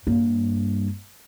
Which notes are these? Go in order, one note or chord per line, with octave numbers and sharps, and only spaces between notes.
G2 A#3